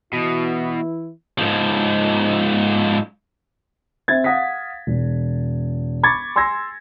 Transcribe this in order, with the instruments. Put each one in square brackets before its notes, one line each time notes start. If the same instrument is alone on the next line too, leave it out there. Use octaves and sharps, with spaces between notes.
[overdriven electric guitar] B2 [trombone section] E3 E4
[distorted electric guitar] G#2 F3
[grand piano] C4 E5 G#6 A6
F5 F#5 D#6 A#6 B6
E1
B5 C#6 D6 G#6 A6 C#7
G#5 C6 E6 G#6 A#6